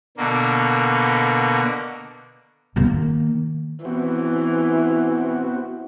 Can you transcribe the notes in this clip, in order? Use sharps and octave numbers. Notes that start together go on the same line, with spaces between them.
B2 D3 A#3
D#3 A#3
E3 B3 C4 F#4